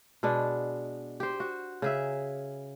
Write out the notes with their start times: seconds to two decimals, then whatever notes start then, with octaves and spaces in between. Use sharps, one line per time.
0.23 B2 G#3 B3 D4
1.20 G4 C5
1.40 F#4
1.82 C#3 G#4 E5